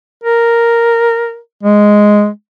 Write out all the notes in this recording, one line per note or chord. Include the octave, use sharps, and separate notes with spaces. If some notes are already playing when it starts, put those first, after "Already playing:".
A#4
G#3